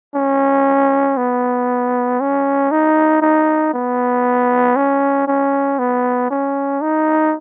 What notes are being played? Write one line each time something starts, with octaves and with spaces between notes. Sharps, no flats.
C#4
B3
C#4
D#4
D#4
B3
C#4
C#4
B3
C#4
D#4